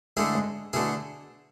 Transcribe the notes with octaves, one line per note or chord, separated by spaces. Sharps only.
D3 G#3 A3 E4 G#4
G#3
B2 D3 A3 E4 G#4